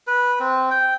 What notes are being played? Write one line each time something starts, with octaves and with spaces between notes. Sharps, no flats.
B4
C4
G5